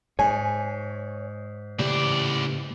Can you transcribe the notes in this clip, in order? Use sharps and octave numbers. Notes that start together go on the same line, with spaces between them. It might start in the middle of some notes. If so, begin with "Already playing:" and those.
G#2 C#5 G#5
A2 C#3 E3 G4 D5